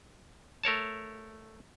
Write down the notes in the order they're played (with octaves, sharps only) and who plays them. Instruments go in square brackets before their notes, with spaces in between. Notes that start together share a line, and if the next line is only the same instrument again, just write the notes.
[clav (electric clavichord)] A3 A#4 C#5 A5